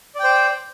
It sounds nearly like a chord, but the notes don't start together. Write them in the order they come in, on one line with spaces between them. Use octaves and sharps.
D5 G5 C5